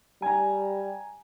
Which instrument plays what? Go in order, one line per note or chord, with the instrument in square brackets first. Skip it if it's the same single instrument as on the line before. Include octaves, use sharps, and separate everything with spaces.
[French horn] G3 [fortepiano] G#5 A#5